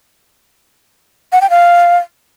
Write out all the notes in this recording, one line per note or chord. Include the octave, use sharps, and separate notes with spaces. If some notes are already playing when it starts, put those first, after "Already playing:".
F#5
G5
F5